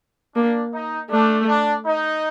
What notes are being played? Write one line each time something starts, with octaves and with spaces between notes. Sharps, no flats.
A#3 D4
D#4
A3 D4
D4
D#4